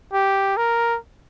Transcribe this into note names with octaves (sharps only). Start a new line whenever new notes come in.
G4
A#4